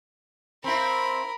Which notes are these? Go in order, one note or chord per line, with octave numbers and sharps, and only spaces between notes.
C4 E4 A#4 B5